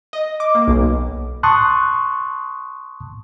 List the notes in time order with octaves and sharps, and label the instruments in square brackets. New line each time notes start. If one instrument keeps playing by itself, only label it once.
[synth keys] D#5
D6
A#3
B1
[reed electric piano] A5 C6 C#6 D#6 F#6